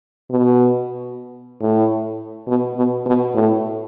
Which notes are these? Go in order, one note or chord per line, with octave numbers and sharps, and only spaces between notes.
B2
A2
B2
B2
B2
A2